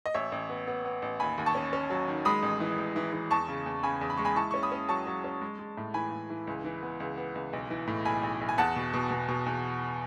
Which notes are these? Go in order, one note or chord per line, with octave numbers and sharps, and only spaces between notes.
D#5
A1 C#5 E5
A1
B3
B3
B3
A1
D#2 G#5 B5
D#2
A5 C#6
C#4
C#4
F#3
D#3
G#3 B5 D#6
A1
E3
A1
E3
E3
E2 A5 C#6
C#3
E2
C#3 G#5 B5
E2
B5
G#3 C#6
G#5 B5
E4 A5 C#6
C#4 C#6
B5 D#6
C#4
F#3 A5 C#6
F#3
C#4
G#3
G#3
A2
E3 G#5 B5
A2
E3
C#2
E3
B3
C#2
B3
C#2
B1
E3
A2
B1 G#5 B5
B1
B1
G#5
E2 F#5 A5
B2
B2
B2
B2
E2